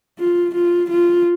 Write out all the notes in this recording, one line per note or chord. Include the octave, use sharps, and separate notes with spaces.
F4
F4
F4